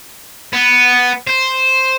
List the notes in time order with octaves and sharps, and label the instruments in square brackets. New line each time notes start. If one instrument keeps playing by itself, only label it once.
[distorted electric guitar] B3
C5